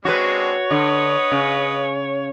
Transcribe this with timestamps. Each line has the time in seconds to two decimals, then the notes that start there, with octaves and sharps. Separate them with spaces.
0.05 G#3 C4 D4 F#4 B4 C#5
0.71 D3 B4 D#5
1.32 C#3